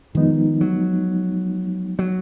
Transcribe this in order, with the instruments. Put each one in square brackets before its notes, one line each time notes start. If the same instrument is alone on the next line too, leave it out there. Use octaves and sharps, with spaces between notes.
[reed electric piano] F2 F3 G#3 B3 D#4 [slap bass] D#3
[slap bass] F#3
F#3